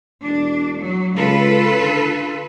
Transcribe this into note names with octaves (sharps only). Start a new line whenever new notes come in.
E1 D4
F#3
C#2 F4 A4 B4
D3